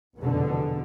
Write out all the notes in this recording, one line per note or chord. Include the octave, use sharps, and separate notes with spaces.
F1 E2 B2 D3